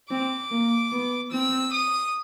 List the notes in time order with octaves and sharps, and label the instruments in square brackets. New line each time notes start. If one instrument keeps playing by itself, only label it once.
[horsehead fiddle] C4 [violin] D6
[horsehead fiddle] A#3
B3
[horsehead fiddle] C4 [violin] E6
[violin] D#6